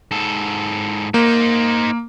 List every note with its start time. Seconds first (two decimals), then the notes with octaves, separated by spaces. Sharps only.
0.11 G#2 A4
1.14 A#3 D#4 C5